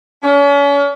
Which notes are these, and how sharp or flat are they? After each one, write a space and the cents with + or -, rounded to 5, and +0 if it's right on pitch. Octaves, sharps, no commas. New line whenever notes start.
C#4 +40